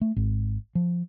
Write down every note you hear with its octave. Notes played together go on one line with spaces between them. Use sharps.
A3
G#1
F3